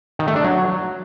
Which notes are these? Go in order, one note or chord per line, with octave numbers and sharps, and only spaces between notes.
D#3
A3
D4
F#3